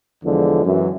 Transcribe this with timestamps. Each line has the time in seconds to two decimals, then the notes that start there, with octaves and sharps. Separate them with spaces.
0.24 E2 D3 F3 G#3
0.65 F#2 E3